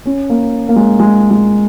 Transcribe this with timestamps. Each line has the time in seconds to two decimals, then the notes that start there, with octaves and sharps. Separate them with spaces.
0.05 C#4
0.29 A#3
0.69 A#3
0.76 G#3
0.99 G#3
1.31 G#3